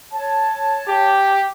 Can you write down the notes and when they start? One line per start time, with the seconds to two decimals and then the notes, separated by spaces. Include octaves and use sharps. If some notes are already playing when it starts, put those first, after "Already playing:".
0.12 C#5 A5
0.88 G4